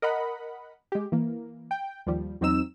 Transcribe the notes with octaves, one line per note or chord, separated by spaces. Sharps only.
A#4 D#5 F#5 B5
G#3 G4
E3 A#3
G5
D#2 F3 G3
E2 F#3 C4 D#4 E6 E7